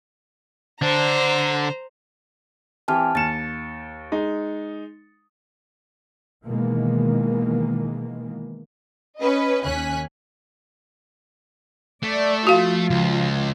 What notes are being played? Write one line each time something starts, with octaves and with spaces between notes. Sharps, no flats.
D3 D4 C5 A#5
E3 C4 G4 G#5 A5 F6
D#2 A6 C#7 E7
G#3 D#4
B2 D#3 E3 G#3 A#3
C#4 B4 D#5
D#2 C#4 G#5 F#6 B6
A3 D5
F3 F4 F#4 F5
C#2